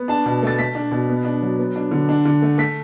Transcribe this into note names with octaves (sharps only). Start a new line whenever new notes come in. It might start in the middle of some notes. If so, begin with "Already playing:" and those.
Already playing: B3
D4 A5
B2
A3 A6
A3 B6
D4
B2
B3
D4
F#3
B3
D4
D3
D4
D3
A3
A3 B6